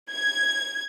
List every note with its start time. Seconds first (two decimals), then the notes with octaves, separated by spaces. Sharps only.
0.10 G#6